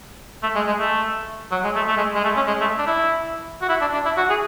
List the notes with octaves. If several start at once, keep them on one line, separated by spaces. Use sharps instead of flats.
A3
G#3
G#3
A3
F#3
G#3
A3
A3
G#3
G#3
A3
C#4
G#3
A3
D4
E4
F#4
E4
D4
D4
E4
F#4
G#4